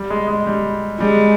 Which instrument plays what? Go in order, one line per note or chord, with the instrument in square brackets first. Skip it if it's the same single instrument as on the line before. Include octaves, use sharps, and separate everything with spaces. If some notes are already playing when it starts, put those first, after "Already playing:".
Already playing: [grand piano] G3
G#3
G#3
G3
[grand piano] G3 [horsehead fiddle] G#3